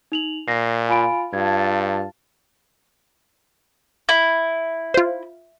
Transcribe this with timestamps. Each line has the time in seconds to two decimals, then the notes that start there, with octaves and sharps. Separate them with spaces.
0.12 D#4 F7 F#7
0.48 A#2 A#6 C7
0.89 F4 G#5 B5 D7
1.33 G2 F4 A5 G#6
4.09 E4
4.94 F4 C5